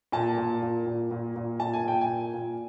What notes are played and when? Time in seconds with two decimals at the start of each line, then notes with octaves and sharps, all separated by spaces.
0.12 A#2 A5
0.38 A#2
0.62 A#2
0.86 A#2
1.11 A#2
1.36 A#2
1.60 A#2 A5
1.73 G#5
1.84 A#2 G5
2.01 G#5
2.09 A#2
2.34 A#2